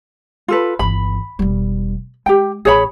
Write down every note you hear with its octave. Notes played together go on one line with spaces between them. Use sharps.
F4 A4 B4
G1 E3 B5
E1 G3
G#3 G4 G5
A1 G#4 C#5 B5